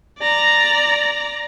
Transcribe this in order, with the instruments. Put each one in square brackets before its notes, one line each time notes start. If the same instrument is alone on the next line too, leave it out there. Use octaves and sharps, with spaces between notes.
[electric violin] D5 A#5